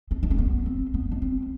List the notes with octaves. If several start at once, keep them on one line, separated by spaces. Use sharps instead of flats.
C4
D4
C4
B3
C4
B3
D4
C4